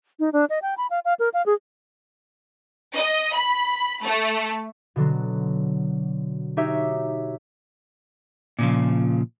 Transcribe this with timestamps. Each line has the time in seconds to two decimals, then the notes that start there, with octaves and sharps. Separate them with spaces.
0.19 D#4
0.33 D4
0.50 D#5
0.62 G5
0.77 B5
0.90 F5
1.05 F5
1.19 A#4
1.34 F5
1.46 G#4
2.95 D#5
3.34 B5
4.03 A3
4.96 B2 D3 F#3
6.57 D#4 F#4 G4 C#5 E5
8.59 A#2 C#3 F3